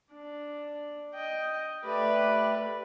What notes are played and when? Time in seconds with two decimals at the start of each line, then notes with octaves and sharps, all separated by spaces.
0.13 D4
1.14 D#5 G5
1.84 A3 G4 B4 D5